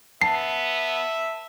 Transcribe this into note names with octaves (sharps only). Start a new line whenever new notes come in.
B3 E5 A5 C7